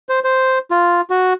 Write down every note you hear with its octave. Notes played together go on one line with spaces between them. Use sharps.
C5
C5
F4
F#4